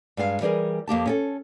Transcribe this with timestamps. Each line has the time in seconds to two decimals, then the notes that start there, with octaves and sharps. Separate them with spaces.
0.17 G2 G#3 G4 F5
0.41 E3 G3 G4 G#4 A#4
0.88 F2 A#3 G4 A5
1.06 C#4 G4 A4